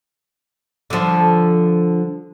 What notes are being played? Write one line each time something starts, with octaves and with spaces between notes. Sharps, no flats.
D3 F3